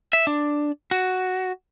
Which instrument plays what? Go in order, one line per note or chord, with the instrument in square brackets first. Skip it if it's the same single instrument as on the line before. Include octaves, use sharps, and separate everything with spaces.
[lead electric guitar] E5
D4
F#4